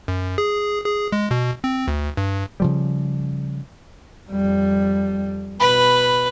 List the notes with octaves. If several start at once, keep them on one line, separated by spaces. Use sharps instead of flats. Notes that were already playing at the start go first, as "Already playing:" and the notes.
F#2
G#4
G#4
G#3
B2
C4
D2
G2
C#3 F3 G3
F2 G3
B2 B4 B5